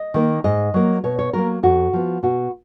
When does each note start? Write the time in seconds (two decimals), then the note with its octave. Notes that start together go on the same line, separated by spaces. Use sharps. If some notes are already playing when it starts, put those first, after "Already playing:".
Already playing: D#5
0.14 D#3 A#3
0.44 G#2 D#5
0.74 F#3 A#3
1.04 B2 C#5
1.19 C#5
1.33 F#3 A#3 A#4
1.63 F2 F#4
1.93 F3 B3
2.23 B2 F#4